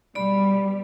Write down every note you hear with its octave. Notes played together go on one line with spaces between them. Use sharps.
B2 G3 D5 B5